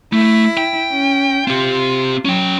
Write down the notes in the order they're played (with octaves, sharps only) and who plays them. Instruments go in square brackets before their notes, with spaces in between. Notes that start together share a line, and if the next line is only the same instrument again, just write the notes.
[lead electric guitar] A3 [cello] E4
[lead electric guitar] G5
[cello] C#4
[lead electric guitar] C4 G4 [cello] F4
[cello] F#3 [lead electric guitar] C#4 G5